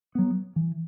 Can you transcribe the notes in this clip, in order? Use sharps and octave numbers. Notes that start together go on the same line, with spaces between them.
F#3 B3
E3